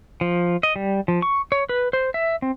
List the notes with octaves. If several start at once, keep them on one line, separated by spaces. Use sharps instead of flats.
F3
D#5
G3
F3
C#6
C#5
B4
C5
E5
C4